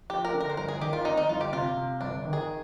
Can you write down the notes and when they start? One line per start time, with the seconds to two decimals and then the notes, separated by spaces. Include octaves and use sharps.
0.10 F3 G4
0.25 A#4
0.34 D3
0.41 A#4
0.50 C5
0.57 G1 A#4
0.68 G#4
0.81 D#3 G4
0.93 F4
1.05 F2 D#4
1.17 D#4
1.29 G1 F4
1.41 G4
1.52 C3 F4
1.77 C3
2.01 G1 D4
2.25 D#3
2.33 G#4